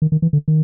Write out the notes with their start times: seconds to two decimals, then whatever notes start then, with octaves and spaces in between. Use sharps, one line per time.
0.02 D#3
0.12 D#3
0.22 E3
0.33 D3
0.48 D#3